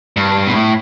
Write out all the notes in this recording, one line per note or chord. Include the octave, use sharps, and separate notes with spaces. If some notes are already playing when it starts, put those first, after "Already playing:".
G2
B2
A2